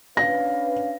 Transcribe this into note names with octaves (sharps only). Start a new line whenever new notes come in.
C#4 D4 B4 F5 A#6